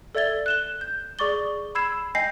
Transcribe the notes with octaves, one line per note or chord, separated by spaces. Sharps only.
A4 D5 E5 G#6 A6 G7
F#6 E7 G7
G6
G#4 D5 C#6 D6 A6 G7
B5 E6 G#6 C7 E7
D#5 G5 G#5 G6 A#6 C7